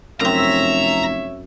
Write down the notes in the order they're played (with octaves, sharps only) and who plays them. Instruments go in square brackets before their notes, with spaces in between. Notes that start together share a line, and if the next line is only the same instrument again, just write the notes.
[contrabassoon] F1 [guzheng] F#2 C4 [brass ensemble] C#5 E5 [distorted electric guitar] A#5